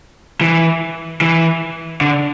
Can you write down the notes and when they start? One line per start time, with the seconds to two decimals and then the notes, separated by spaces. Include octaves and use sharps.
0.41 E3
1.21 E3
2.01 D3